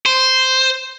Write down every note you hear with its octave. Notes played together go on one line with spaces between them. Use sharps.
C5